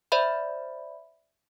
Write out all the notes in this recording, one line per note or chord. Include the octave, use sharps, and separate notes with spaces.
C5 D5 E5 B5